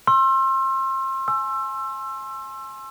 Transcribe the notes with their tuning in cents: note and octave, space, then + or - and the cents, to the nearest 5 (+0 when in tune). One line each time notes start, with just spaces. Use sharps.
C6 +30 E6 +25
G#5 +20 E6 +20